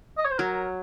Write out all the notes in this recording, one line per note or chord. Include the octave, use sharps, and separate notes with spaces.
D#5
C#5
C5
F#3 A#4